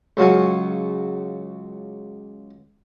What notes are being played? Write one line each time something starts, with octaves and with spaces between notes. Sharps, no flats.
C#2 F#3 F#4 F5 G#5